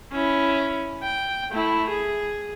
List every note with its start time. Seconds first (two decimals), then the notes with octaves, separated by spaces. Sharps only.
0.12 C#4 E4
1.03 G5
1.52 A3 E4
1.90 G#4